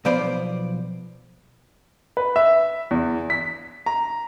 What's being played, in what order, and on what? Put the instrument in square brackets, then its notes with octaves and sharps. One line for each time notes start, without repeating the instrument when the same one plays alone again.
[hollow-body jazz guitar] B1 F3 B3 C5 D5 F5
[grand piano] B4
E5
E2
B6
A#5